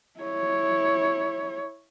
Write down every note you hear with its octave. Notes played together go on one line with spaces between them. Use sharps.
E4 C#5